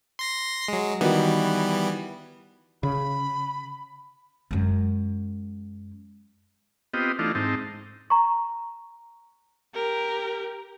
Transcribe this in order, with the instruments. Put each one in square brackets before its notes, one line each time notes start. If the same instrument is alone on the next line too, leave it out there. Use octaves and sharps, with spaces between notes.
[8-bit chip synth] C6 A#6 C7
F#3 G#3
[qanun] D#3 F#4 [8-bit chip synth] E3 G3 B3
[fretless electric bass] C#3 [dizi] B5
[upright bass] F#2 G#3
[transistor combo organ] B3 C4 F4 G4 D#5
E3 A3 D4 D#4 F4
G#2 C4 D#4 A5
[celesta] A#5 C#6
[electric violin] G4 A#4